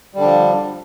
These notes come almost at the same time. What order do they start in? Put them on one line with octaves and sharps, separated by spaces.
G3 D3 D4 F3